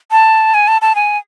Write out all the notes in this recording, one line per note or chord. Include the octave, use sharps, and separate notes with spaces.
A5
G#5
A5
A5
G#5